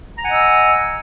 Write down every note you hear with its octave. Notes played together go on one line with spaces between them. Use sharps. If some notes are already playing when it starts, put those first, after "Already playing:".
D#5 F#5 G#5 A#5 E6